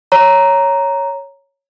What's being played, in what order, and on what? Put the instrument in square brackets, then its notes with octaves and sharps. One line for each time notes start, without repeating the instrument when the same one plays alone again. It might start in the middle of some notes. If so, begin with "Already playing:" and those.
[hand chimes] C#5 A#5